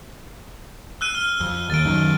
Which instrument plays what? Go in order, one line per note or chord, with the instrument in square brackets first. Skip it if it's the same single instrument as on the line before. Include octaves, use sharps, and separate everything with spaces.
[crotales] E6 F#6 D#7
F6 G7
[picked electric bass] F2
[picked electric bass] D#2 [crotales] A6 D7
[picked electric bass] F#2 D#3